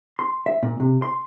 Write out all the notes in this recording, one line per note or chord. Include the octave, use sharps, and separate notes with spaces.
C6
E5
A#2
C3
C6